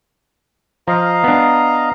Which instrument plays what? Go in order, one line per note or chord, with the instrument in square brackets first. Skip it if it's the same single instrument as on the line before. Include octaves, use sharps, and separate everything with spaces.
[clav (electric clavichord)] F3 [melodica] D#5 F5 A#5
[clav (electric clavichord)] B3 D4